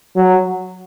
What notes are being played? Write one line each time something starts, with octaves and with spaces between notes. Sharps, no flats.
F#3